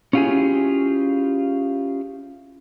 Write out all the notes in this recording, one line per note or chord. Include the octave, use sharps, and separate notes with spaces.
C#4 E4 F4 G4 G#4 G#5